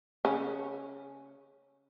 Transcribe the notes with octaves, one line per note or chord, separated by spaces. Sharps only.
C#3 C#4